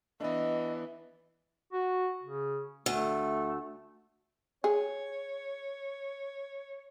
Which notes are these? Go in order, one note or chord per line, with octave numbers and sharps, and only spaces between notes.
E3 B3 D4 D#5
F#4
C#3
D2 A3
G#4 C#5